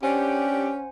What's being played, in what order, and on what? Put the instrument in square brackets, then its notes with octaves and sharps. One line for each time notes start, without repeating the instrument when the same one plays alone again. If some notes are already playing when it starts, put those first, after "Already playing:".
[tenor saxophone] C#4 [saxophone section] D4 G4 [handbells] C5 F#5 G#5